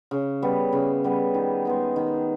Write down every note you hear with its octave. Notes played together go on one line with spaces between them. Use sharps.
C#3
G3 B3
C#3
G3 B3
D#3
G#3 B3 D#4
D#3